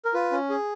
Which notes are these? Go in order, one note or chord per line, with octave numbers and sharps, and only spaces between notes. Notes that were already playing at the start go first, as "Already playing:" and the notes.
A#4
F4 B4
C#4
G#4